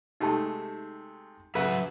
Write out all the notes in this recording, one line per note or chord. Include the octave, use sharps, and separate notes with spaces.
C3 G#3 A3 D#4 G4 A5
C#3 F#3 B4 E5 F#5